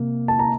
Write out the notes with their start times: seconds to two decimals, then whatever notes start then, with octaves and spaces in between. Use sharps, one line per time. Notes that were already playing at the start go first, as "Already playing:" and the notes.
Already playing: C3 A#3
0.28 A5
0.39 A#5